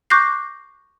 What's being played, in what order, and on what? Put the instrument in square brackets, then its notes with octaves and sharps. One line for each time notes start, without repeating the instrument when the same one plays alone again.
[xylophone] C#6 D6 F#6 G6 A#6 C7